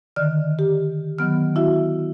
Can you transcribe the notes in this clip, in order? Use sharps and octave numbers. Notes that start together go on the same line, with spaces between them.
D3 D#3 D5 F6
G4
D#3 F#3 B3 F6
E4 F#4 E5